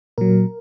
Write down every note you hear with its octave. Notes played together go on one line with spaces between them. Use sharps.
A#2 F#3 A#4